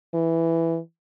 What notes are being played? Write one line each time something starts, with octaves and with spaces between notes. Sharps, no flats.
E3